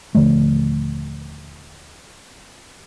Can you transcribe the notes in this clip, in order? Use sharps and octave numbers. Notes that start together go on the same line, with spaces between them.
D#1 D3 F3 A3